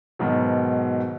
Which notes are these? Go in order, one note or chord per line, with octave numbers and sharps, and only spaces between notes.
G#2 B2 D#3 F#3